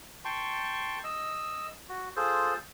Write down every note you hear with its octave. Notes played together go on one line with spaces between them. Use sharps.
G5 A5 C6 C#6
D#5 E6
F#4
F4 G#4 A4 C5